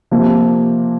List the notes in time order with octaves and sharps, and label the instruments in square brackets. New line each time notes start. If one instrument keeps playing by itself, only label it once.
[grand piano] C3 F3 A#3